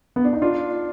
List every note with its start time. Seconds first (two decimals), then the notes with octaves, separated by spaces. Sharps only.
0.16 B3
0.25 D4
0.33 D#4
0.42 D4 F4